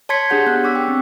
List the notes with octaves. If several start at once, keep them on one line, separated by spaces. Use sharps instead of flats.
C#5 A5 C6 G#6 B6 C#7
D4 G4 G#4 F#5 G6
B3 F#6
D4 C#6 D6 E6 B6
G5
C4